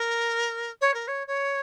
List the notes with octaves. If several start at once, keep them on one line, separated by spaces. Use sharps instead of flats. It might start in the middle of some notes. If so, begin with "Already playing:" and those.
Already playing: A#4
C#5
A#4
C#5
C#5